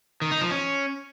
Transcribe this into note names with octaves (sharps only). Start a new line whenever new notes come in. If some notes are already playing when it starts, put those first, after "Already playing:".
D#3
D#4
F3
C#4